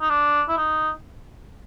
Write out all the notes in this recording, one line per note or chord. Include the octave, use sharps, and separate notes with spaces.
D#4
D4
E4
D#4